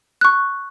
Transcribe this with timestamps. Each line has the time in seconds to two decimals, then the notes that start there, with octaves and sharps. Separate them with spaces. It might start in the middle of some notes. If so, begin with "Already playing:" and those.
0.21 C#6 F#6